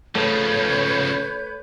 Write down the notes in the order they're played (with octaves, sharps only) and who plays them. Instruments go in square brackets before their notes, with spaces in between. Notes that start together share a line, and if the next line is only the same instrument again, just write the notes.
[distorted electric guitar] C#3 F3 [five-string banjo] A3 [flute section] B4 C#5 G6